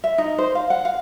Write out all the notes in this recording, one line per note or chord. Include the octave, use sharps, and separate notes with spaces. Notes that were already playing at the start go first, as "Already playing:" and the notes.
E5
D#4
C5
F5
F#5
F5